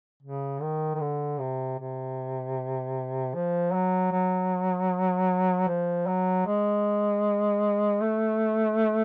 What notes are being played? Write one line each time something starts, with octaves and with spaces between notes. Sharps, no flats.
C#3
D#3
D#3
D3
C3
C3
F3
F#3
F#3
F3
F#3
G#3
A3